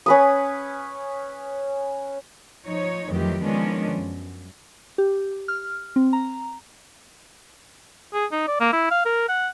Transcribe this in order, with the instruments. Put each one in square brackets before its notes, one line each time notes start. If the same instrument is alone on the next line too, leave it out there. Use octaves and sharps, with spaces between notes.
[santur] C#4 B4 D#6
[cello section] F3 D#4 C#5
F2 D#3 E3 F#3 A3 G4
D#3 F3 G#3 B3 C#4 D4
F#2
[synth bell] G4
F6
C4
A#5
[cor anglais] G#4
D#4
D5
A#3
E4
F5
A#4
F#5